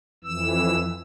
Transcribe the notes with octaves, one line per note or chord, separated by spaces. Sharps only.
F2 E3 E6